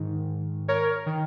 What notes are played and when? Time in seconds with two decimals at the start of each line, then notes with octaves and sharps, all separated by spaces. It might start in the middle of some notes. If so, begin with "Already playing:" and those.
Already playing: G#2 D#3
0.68 A#4 C#5
1.06 D#3